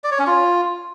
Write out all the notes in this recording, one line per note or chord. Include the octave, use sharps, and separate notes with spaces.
D5
C#5
C#4
F4